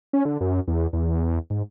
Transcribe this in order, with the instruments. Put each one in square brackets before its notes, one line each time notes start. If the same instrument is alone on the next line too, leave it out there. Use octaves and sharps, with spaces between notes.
[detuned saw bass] C#4
D3
F#2
E2
E2
G#2